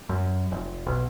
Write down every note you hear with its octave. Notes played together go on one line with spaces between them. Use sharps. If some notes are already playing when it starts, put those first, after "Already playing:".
F#2
F1
B1